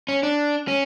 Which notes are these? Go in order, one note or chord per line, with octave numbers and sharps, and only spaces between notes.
C#4
D4
C#4